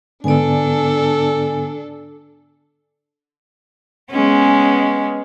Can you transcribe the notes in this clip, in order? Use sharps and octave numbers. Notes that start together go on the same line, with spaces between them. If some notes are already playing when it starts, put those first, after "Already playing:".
G#2 D3 B3 D4 A4 D5 G#5
G#3 B3 C#4